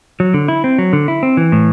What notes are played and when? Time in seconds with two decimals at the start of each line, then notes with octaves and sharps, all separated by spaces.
0.20 F#3
0.34 D3
0.48 E4
0.64 C4
0.78 F#3
0.93 D3
1.08 E4
1.23 C4
1.37 E3
1.52 A2